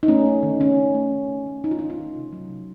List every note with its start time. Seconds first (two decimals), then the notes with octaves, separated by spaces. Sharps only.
0.03 D#4
0.08 A3 C#4
0.26 A3
0.43 D#3
0.60 D#3 C#4
0.77 A3
0.94 A3
1.12 D#3
1.29 D#3
1.46 A3
1.64 A3 D#4
1.71 F4
1.79 D#3 D#4
1.90 F4
1.98 D#3
2.16 C3
2.33 F#3
2.49 C3